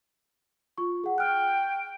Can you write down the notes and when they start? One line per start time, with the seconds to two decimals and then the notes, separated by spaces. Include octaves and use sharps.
0.78 F4 C#6
1.04 G#4 F#5
1.18 G5 F6 F#6